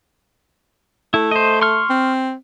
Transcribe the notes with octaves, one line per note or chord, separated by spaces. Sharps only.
A3 E4
C5 D#5
C6 C#6 F6
C4